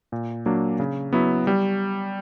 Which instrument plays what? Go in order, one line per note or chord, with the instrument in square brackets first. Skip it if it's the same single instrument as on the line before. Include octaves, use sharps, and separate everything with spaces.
[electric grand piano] A#2
F#3 A#3 D4
C#3
F#3 B3 E4
G3